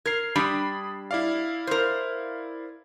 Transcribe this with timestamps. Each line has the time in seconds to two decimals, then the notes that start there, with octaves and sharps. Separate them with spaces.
0.06 A#4 G#6 C7
0.36 G3 D4 B5 D#6
1.11 E4 D5 F5
1.67 A#4 C5